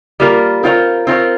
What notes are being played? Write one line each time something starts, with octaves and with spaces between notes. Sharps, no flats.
G3 A#3 F4 A#4
C4 F4 A#4 C#5
C4 F4 A#4 C#5